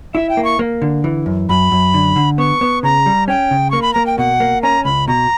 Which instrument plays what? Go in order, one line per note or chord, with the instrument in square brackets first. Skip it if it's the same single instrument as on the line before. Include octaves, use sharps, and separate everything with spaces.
[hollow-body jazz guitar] E4 [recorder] E5
[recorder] G5
[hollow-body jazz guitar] A#3
[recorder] C#6
[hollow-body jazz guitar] A#3
D3
E3
F#2
[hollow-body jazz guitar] F#2 [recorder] B5
[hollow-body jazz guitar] F#2
D3
D3
[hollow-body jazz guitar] B3 [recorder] C#6
[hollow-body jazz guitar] B3
[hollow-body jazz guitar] C#3 [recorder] A#5
[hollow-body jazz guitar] G3
[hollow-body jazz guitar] C#4 [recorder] G5
[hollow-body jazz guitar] C#3
[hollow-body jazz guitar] A#3 [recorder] C#6
[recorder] B5
[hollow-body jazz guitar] A#3 [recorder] A#5
[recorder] G5
[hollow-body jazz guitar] B2 [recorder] F#5
[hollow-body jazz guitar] A#3
[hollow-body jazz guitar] C#4 [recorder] A#5
[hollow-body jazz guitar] C#2 [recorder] B5
[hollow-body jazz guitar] B2 [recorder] A#5